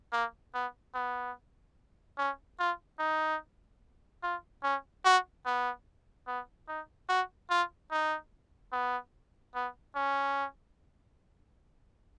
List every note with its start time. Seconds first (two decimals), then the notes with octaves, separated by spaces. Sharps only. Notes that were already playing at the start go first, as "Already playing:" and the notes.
0.12 A#3
0.54 B3
0.95 B3
2.18 C#4
2.59 F4
2.99 D#4
4.23 F4
4.63 C#4
5.05 F#4
5.46 B3
6.27 B3
6.68 D#4
7.09 F#4
7.50 F4
7.91 D#4
8.72 B3
9.55 B3
9.95 C#4